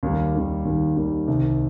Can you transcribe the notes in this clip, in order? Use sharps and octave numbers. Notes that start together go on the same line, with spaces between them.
D#2 D#3 G3 A#3
D#2 D#3 G3 A#3
D#2 D#3 G3 A#3
D#2 D#3 G3 A#3
C2 C3 D#3